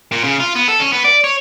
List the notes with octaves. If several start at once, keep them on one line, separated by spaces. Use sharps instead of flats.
A#2
C#3
F4
B3
A4
C#4
B3
D5
C#5